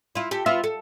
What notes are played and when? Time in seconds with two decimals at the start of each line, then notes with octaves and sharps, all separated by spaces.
0.15 E4 F4
0.31 G4 A4
0.46 B3 F4 E5
0.64 A4